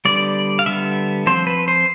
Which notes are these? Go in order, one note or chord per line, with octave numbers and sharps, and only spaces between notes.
D3 G3 B3 D5
F5
D3 G3 B3 E5
F3 C4 C5
B4
C5